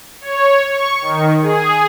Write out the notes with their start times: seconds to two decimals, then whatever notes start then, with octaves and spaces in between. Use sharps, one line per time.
0.21 C#5
0.67 C#6
1.01 D#3
1.42 G#4